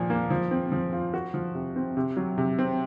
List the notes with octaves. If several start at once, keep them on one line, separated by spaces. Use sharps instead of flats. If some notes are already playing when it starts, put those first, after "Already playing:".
Already playing: A#2 F3
A#3
F3
C4
F3
F4
F#4
F3
C3
C4
C3
F#3
C3
C4